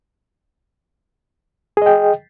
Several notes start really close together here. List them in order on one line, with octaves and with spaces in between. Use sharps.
G#4 D#5 G5